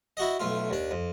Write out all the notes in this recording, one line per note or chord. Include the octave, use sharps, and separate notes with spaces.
E4 F#4 D#5
B1 A3 F4
D#2 D4
F2